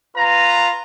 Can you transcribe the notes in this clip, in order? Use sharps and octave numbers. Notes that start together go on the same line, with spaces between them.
F4 B4 A#5